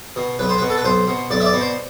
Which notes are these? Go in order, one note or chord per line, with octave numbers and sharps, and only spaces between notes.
B2
B1 B4
C5
B2 B4
A4
B4
B1 C5
B2
B1 D5
E5
D5
B2
C5